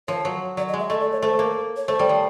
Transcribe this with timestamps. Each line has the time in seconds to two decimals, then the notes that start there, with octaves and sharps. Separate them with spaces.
0.08 F3 C#5
0.25 F#3
0.57 F#3 D5
0.69 D#5
0.74 G#3
0.79 E5
0.90 A3 D#5
1.01 D5
1.12 C#5
1.22 A3 C5
1.39 A#3
1.77 C#5
1.88 A3 C5
1.99 G3
2.09 F3